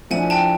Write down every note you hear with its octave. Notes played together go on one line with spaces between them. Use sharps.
A2 F3 A3 D4 F#5 G#5
G5 A5